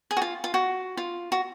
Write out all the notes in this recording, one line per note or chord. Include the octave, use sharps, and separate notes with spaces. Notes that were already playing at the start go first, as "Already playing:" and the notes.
G#4
F#4
F4
F4
F#4
F4
F#4